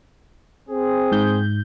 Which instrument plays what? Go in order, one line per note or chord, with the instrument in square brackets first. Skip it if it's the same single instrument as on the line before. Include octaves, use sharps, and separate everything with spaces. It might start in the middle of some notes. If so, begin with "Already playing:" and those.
[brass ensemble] C4 G#4
[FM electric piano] G#2 G6